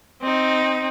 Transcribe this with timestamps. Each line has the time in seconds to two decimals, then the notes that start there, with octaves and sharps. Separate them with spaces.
0.22 C4 D#4